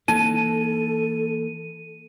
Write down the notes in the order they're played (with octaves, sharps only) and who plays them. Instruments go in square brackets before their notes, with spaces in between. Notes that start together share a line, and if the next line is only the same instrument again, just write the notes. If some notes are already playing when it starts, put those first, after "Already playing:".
[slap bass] E3 A#3 [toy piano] D#4 [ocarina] A4 [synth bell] D#7